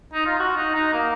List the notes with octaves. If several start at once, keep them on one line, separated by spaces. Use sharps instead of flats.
D#4
F4
F#4
D#4
D#4
A#3